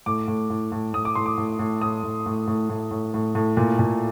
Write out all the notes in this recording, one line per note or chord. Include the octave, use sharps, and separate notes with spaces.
A2 D6
A2
A2
A2
A2 D#6
D6
A2 C6
D6
A2
A2
A2 D#6
A2
A2
A2
A2
A2
A2
A2
A#2
A#2